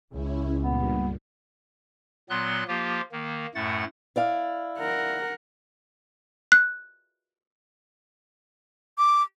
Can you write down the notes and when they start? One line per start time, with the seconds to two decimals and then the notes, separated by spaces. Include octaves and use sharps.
0.12 C#2 C#4 E4
0.64 G2 A#2 B3
2.30 A#2 F#3 B3 C6 F#6
2.68 F3 A#3 F4 G4
3.12 D#3 A#3
3.55 F#2 A2 A3 F#5 A6
4.16 E4 D5 F5
4.79 A#4 F#5
6.52 F#6
8.98 D6